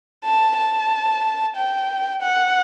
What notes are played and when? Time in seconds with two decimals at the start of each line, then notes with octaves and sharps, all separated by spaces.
0.24 A5
0.57 A5
1.56 G5
2.22 F#5